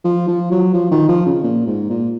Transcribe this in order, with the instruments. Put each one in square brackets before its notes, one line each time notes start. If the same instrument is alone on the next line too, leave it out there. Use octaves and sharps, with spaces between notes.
[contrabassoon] F3
F3
F#3
F3
D#3
F3
C#3
A#2
G#2
A#2